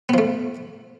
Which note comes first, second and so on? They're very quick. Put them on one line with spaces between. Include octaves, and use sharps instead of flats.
B3 F3 A3